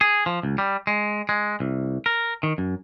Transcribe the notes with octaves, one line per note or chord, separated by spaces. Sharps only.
G#4
F3
C#2
G3
G#3
G#3
C2
A#4
D#3
F#2